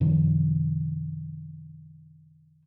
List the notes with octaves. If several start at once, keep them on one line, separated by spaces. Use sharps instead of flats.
F#2 C3 D#3 F3